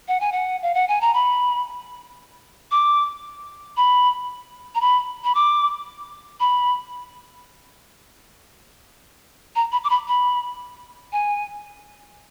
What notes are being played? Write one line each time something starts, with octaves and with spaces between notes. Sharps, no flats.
F#5
G#5
F#5
F5
F#5
G#5
A#5
B5
D6
B5
A#5
B5
B5
D6
B5
A#5
B5
D6
B5
B5
G#5